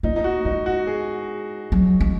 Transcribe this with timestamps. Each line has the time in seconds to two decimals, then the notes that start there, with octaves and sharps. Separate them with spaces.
0.03 A#3 D#4
0.16 D#4
0.24 F#4
0.45 G#3 D#4
0.66 F#4
0.87 G#4
1.72 F#3
2.00 G#3